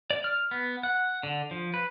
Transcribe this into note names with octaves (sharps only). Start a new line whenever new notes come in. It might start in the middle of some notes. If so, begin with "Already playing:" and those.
D5
F6
B3
F#5
D3
F3
B4